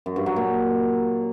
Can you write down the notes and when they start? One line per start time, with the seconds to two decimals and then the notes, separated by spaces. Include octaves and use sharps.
0.06 F#2
0.16 G2
0.26 F#3
0.36 A#2